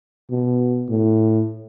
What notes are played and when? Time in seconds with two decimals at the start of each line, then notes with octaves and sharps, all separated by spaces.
0.31 B2
0.89 A2